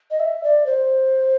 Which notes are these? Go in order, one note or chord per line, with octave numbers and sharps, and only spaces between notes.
D#5
E5
D5
C5